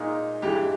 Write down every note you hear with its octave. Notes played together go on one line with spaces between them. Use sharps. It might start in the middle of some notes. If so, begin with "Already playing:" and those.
Already playing: A#2 G#3 D#4
G2 E3 G#3 G4